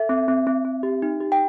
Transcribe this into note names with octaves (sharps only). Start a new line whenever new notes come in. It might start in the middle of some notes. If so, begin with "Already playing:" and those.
Already playing: A4 E5
C4
C4
C4
C4
G4
D#4
G4
G5